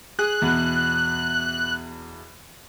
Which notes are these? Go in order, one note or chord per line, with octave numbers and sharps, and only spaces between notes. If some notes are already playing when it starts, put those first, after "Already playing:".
G#4 F#6
E2 B2